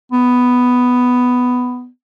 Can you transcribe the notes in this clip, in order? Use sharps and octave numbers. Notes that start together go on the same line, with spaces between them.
B3